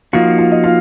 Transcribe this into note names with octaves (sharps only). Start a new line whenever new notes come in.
F3 A#3 D#4 F4 F#4 F5
F4 F5
D#5
F4 F5